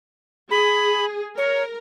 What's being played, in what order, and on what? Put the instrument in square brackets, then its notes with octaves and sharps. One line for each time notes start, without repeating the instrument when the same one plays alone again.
[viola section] G#4 [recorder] B5
[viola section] A#4 [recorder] C#5